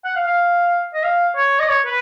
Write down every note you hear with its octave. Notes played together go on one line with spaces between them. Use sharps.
F#5
F5
F5
D#5
F5
C#5
D#5
C#5
B4